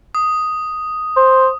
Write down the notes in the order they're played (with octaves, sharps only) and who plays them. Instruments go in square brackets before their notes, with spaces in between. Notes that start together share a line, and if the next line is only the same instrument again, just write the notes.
[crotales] D#6
[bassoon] C5